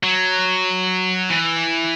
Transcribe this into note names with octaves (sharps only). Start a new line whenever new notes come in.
F#3
E3